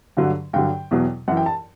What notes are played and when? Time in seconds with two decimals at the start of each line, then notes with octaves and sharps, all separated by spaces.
0.17 G2 D3 F#3
0.53 G2 D3 F#3 G5
0.91 E2 B2 F#3
1.28 F#2 F#5
1.31 E3
1.37 G5
1.46 A5